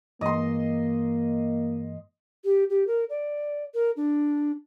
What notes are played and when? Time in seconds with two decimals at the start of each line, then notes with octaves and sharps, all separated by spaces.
0.21 G2 E3 G#3 A#3 D#5 C6
2.44 G4
2.70 G4
2.87 A#4
3.10 D5
3.74 A#4
3.97 D4